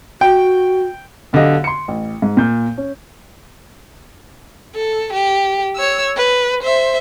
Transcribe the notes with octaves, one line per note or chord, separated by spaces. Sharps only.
F#4 G5
B1 D3 B3 G4 D#5 F5
C6 C#7
A1
G#2
A#2 G6
C#4
A4
G4
C#5 E6
B4
C5 E5